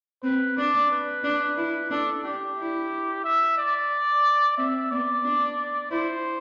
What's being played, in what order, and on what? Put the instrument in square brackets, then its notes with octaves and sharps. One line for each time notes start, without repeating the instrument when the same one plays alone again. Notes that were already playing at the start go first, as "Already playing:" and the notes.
[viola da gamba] C4 [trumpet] B4
[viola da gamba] D4 [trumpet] D5
[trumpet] B4
[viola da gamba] D4
[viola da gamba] E4 [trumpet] B4
[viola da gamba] D4 [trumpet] A4
[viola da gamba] D4 [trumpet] G4
[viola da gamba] E4
[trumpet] E5
D5
[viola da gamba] C4 [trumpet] E5
[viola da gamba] B3 [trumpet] D5
[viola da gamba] D4
[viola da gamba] E4 [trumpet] C5